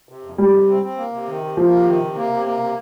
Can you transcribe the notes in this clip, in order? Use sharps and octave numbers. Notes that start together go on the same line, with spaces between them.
C3
F2
F2 G3
C3
C4
C4
A#3
C3
D#3
C3
F3 A#3
C3
D#3
C3
A#3
C3
A#3
C3